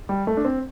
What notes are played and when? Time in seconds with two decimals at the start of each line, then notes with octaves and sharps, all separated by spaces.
0.09 G3
0.27 A3
0.37 D4
0.45 C4